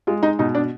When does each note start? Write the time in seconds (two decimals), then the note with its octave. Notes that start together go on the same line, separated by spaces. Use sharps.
0.07 G#3 F4
0.23 D#4
0.39 B2 D#4
0.55 D4